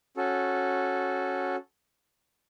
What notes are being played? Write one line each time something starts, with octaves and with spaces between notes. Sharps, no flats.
C#4 F#4 A4